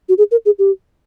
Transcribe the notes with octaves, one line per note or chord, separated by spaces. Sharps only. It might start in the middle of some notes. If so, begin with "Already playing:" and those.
F#4
G#4
A#4
G#4
G4